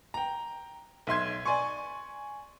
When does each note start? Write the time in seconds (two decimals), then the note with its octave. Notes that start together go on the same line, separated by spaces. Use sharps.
0.14 G5 A#5
1.07 B1 E5 C6 G#6
1.46 D5 G#5 C6 C#6